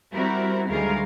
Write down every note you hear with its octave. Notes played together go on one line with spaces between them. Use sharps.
G3 C4 E4 F#4 A#4
D2 D#3 G3 G#3 A#4 F5